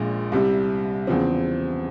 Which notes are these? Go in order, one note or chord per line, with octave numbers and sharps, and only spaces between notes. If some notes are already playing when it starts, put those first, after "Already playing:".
Already playing: A#1 A#2 F3 G#3
C2 C3 G3
E2 C#3 F3 C4